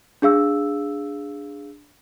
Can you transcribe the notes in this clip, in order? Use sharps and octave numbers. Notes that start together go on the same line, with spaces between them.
D4 G#4 F5 E6